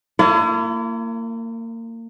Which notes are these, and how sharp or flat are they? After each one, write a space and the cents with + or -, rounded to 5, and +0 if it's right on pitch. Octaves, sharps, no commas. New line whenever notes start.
A#3 -30 E4 +40